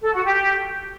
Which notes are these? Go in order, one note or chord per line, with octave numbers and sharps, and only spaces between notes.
A4
F#4
G4